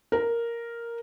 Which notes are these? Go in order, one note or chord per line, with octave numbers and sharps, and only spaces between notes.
A#4